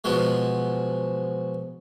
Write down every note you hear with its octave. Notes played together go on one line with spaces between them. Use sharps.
B2 F3 F#3 G#3